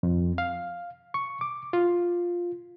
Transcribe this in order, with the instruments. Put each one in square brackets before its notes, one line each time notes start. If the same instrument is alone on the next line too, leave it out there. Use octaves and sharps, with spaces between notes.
[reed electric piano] F2
F5
C#6
D6
F4